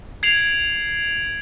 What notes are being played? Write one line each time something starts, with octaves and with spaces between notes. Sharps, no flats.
G#6 C7 D7 F7 F#7